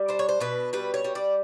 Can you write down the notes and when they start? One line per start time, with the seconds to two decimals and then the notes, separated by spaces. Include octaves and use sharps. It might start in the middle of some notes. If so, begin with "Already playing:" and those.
Already playing: G3
0.09 D4 C5
0.19 C#5
0.29 C5
0.40 B2 B4
0.73 G3 B4
0.94 C#5
1.05 G3
1.15 D5